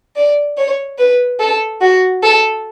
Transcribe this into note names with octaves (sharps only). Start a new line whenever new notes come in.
D5
C#5
B4
A4
F#4
A4